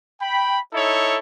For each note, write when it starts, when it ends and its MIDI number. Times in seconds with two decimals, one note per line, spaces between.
0.21 0.59 79
0.21 0.59 83
0.74 1.18 63
0.74 1.18 64
0.74 1.18 69
0.74 1.18 73